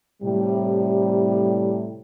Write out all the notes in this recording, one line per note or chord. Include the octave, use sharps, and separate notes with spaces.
A2 C3 G3